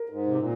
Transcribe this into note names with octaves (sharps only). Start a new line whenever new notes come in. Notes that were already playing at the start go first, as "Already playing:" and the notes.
Already playing: A#4
G#2
C3
A#2